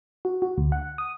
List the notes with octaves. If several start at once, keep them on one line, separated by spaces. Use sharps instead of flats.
F#4
F#4
D2
F#5
D#6